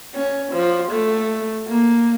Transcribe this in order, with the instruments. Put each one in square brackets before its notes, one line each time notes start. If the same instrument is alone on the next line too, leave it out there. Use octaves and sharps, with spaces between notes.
[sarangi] C#4
F3
A3
A#3